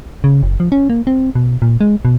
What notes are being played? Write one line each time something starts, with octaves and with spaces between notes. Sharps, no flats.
C#3
F#1
F3
C#4
A#3
C4
B2
A#2
G#3
B2